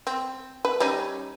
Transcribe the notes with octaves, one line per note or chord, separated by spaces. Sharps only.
C4
B4
G3 C#4 D#4